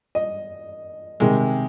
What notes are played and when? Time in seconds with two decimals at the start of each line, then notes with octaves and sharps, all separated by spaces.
0.15 D#5
1.20 C3 D#3 G#3